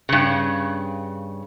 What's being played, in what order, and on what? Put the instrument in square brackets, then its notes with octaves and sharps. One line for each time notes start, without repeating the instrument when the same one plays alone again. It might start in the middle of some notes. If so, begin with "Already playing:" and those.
[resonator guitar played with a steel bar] G2 C#3